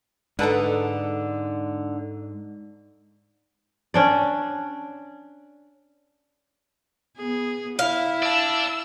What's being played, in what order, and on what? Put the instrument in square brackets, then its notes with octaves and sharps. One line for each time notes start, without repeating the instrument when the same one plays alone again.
[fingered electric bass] G#2 [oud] D3 D#4 [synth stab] A4 B4 F#5
[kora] C#4 D4 D5
[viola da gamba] B3 G#4
[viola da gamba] E4 [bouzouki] F5
[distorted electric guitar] D5 A5 [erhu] E6